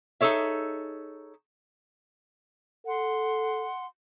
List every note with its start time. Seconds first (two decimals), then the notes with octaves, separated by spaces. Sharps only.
0.21 D#4 G#4 A4 C#5 E5
2.86 A4 F#5 C6